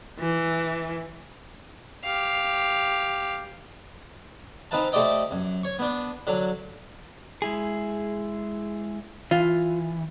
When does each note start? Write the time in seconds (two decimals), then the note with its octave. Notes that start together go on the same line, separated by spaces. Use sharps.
0.19 E3
2.04 G4 F5
4.71 C4 D#4 B4 F5 A5
4.92 A3 G4 C5 D5 D#5 G5
5.31 F#2
5.63 C#5 C#6
5.79 B3 D4
6.27 D3 F#3
7.42 G#3 E4 G#4
9.31 E3 F4